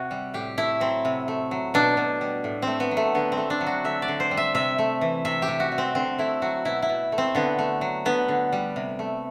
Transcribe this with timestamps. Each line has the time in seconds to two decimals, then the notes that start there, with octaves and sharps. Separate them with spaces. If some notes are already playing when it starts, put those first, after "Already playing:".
Already playing: C3 F#4
0.11 G3
0.34 A2 G4
0.57 A3 E4
0.80 F#3 C4
1.05 C3
1.28 A3
1.51 F#3
1.74 B2 D4
1.97 B2
2.21 G3
2.44 A2
2.62 A3 C4
2.80 B3
2.91 F#3
2.97 A3
3.14 D3 B3
3.32 C4
3.37 A3
3.50 D4
3.61 F#3
3.67 F#4
3.84 D3 E5
4.02 D5
4.08 D3
4.20 C5
4.31 G3
4.37 E5
4.55 C3 E5
4.78 A3
5.01 E3
5.25 C3 E5
5.42 G4
5.48 C3
5.60 F#4
5.72 G3
5.78 C4
5.95 D3 C4
6.18 A3 E4
6.42 F#3 F#4
6.65 B2 E4
6.82 E4
6.89 B2
7.12 A3
7.18 C4
7.35 D3 B3
7.59 A3
7.81 F#3
8.05 D3 B3
8.28 D3
8.52 G3
8.76 C3
8.99 A3